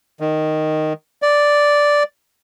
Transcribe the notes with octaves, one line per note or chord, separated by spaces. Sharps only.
D#3
D5